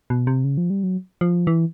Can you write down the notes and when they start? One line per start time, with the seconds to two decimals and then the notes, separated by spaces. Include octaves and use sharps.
0.10 B2
0.27 C3
0.44 C#3
0.58 F3
0.70 G3
0.83 F#3
1.21 F3
1.47 E3